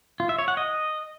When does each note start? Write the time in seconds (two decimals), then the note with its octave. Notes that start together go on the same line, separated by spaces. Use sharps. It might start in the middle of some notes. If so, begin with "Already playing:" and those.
0.20 F4
0.29 E5
0.39 C#5
0.48 F#5
0.57 D#5